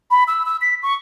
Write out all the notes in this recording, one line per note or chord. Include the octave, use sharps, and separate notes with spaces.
B5
E6
E6
B6
C#6